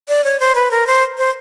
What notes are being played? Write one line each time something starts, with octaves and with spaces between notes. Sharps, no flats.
D5
C#5
C5
B4
A#4
C5
C5